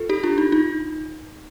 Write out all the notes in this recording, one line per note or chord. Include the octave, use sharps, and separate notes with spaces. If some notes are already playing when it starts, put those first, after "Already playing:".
Already playing: F4 A4
D#4 G4
D4 F4
D#4
D#4